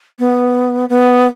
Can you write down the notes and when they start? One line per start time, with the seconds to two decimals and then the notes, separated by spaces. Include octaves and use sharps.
0.19 B3
0.89 B3